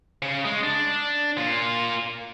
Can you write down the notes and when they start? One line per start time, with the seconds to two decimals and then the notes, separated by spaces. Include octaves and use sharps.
0.22 C#3
0.45 G#3
0.63 D4
1.38 A#3 F4